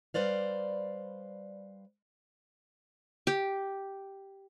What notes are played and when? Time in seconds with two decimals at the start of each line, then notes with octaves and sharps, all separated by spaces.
0.14 G3 B4 C5 D5 F5
3.27 G4